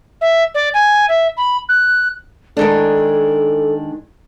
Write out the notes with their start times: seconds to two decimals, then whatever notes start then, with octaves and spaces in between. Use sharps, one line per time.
0.21 E5
0.55 D5
0.74 G#5
1.09 E5
1.37 B5
1.69 F#6
2.57 D#3 G#3 D4 A4